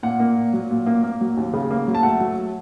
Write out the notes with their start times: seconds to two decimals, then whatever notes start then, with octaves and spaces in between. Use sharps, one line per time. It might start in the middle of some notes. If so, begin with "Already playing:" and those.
0.03 A#2 F#5
0.19 A#3
0.37 A#2
0.53 F#3
0.71 A#2
0.87 A#3
1.03 A#3
1.21 F#3
1.37 D#2
1.53 C#3
1.71 A#3
1.87 F#3
1.95 A5
2.03 A3 F#5
2.20 F#3